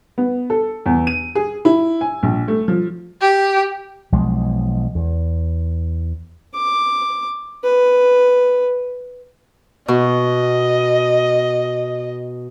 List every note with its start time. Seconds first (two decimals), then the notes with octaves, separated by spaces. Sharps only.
0.18 B3
0.50 A4
0.86 E2
1.07 D#7
1.35 G#4
1.65 E4
2.01 G#5
2.23 A#1
2.48 A3
2.68 F3
3.21 G4
4.12 B1 F3 G#3
4.95 E2
6.55 D6
7.64 B4
9.88 B2 D#5